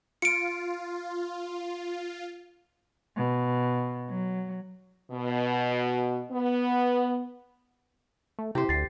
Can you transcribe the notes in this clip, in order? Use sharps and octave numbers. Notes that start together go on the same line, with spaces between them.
F4 C#7 D7
B2
F#3
B2
B3
A3
C3 E4 G4 C5
D2 A6 C7